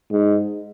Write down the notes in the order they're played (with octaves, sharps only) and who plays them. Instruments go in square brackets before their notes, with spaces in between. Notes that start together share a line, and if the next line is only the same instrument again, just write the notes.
[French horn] G#2